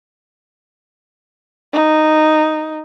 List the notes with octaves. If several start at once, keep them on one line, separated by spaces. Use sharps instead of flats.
D#4